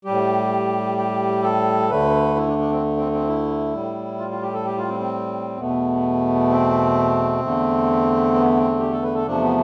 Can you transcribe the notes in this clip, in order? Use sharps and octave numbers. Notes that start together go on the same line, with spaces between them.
A2 G3 G4
G4
A4
D2 D3 A3 B4
E4
D4
D4
C4
C4
C4
E4
A2 G3
F4
F4
G4
A4
G4
F4
C4
C4
E2 B2 A3 B3
C4
E2 D3 A3
B3
C4
G4
A4
B4
A4
E2 C3 F3 A3 D4
B3